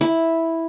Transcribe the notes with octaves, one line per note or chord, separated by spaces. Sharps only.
E4